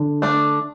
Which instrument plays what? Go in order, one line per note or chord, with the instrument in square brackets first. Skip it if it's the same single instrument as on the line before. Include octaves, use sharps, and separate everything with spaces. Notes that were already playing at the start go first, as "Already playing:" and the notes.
Already playing: [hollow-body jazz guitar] D3
[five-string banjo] A3 D4